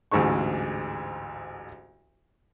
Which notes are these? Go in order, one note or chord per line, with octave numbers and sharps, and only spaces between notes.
A1 D2 G#2 G#3 C#6